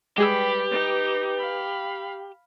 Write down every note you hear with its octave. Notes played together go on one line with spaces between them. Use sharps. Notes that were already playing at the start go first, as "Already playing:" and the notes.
G3 G#3 G4 G#4 B4 B5 E6
D#4
F5 B5